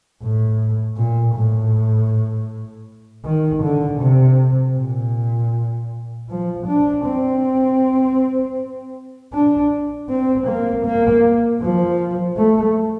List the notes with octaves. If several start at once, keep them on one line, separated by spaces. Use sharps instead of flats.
A2
A#2
A2
D#3
D3
C3
A#2
F3
D4
C4
D4
C4
A#3
A#3
F3
A3